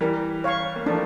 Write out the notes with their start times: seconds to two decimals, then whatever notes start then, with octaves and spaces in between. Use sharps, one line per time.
0.01 E3 G3 A#4
0.44 C#5 F5 C#6
0.76 A#3
0.86 F3 A3 D4